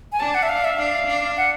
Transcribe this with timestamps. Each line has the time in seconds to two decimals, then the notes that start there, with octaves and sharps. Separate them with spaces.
0.12 G#5
0.20 D4 A5
0.34 F#5
0.43 E5
0.49 F5
0.64 E5
0.78 D4 F5
1.07 D4
1.37 F#5